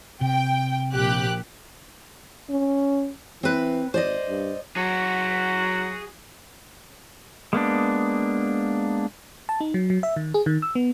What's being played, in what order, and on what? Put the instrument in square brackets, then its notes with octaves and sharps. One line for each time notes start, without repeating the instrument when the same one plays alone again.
[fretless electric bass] C3 [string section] G5
[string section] A#1 G4 F#6
[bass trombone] C#4
[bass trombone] E3 [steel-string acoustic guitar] C4 B4
[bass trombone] G#1 [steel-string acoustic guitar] C5 D5 D#5
[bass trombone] G2
[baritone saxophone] F#3 [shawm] F#4 [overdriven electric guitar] G#4 F#5
[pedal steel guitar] G#3 A#3 B3 D4
[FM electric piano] A5
D#4
F#3
F#3
E5
D#3
G#4
D#3
E6
B3